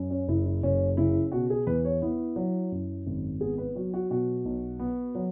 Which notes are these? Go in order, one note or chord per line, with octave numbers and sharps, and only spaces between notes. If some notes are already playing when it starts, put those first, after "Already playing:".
Already playing: F#2
C#4
F#1 E4
E4
F#1 C#4
C#3 E4
B2 F#4
G#4
E2 B4
C#5
B3 E4
F#3
F#2
G#1
B3 G#4
B4
F#3 F#4
F#4
B2 F#4
B1
B3
F#3